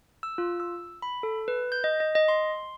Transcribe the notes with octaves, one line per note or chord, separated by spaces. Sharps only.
E6
F4
E6
B5
A4
B4
G6
D#5
D#5
D#5
C6